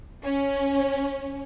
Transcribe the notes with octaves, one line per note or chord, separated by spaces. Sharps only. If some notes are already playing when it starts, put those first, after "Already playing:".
C#4